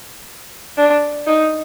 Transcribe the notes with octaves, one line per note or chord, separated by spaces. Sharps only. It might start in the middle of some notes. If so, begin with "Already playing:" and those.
D4
D#4